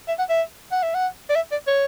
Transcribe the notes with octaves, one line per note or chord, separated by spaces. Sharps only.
E5
F#5
E5
F#5
E5
F#5
D5
E5
D5
C#5